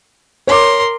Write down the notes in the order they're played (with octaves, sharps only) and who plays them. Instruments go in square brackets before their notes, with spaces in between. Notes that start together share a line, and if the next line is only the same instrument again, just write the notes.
[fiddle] A#4 C6 [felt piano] C#5 D6